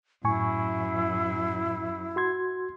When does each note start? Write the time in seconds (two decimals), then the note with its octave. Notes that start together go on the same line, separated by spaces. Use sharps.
0.24 F#2 A2 E4 G#5 C#6
2.16 F#4 C6 G#6